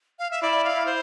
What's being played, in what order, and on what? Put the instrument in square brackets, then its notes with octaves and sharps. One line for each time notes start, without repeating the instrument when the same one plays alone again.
[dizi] F5
E5
[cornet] E4 [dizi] D5
[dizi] F5
C5